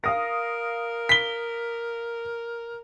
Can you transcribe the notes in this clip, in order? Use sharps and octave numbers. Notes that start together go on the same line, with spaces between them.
A#4 F5 D#6 A#6
B6 G7